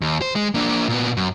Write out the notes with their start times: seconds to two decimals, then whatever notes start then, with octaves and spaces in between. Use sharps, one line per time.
0.01 D#2
0.21 C5
0.36 G#3
0.54 A#3 D4
0.88 A#2 B3
1.17 F#2